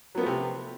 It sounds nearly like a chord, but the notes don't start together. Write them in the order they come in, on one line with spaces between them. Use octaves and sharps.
F#3 B3 F3 A3 C3